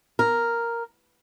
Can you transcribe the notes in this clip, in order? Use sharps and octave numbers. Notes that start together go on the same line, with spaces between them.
A#4